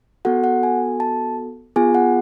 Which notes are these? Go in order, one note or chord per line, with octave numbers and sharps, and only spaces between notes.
B3 F#4 A4 F#5
F#5
G#5
A5
B3 F4 G#4 G#5
F#5